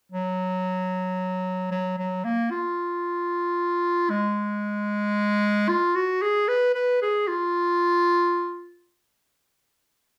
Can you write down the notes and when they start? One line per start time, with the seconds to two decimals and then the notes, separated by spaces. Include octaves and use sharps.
0.12 F#3
1.71 F#3
1.98 F#3
2.24 A#3
2.51 F4
4.10 G#3
5.69 F4
5.95 F#4
6.22 G#4
6.48 B4
6.75 B4
7.02 G#4
7.28 F4